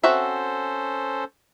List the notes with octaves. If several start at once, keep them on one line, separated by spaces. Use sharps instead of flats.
C4 C#4 F#4 A4 C5 E5